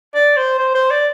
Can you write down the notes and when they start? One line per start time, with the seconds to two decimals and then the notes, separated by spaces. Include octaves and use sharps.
0.15 D5
0.37 C5
0.59 C5
0.75 C5
0.91 D5